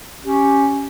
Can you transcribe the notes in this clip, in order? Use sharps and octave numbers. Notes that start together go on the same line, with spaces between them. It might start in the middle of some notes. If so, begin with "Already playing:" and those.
C#4 G4